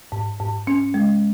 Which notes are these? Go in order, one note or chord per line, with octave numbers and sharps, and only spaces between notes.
G#2
G#2
C#4
G#3